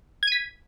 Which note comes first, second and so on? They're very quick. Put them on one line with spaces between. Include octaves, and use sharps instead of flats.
G#6 D#7 B6